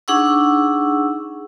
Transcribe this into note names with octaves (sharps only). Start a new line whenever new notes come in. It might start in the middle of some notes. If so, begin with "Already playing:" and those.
D4 D#4 G#4 F#5 C#6 E6